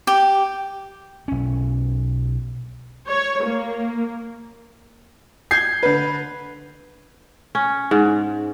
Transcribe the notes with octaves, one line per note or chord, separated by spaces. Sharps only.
G4
B1 C#4
C#5
A#3
G6 G#6 C7
D3 B4
C#4
G#2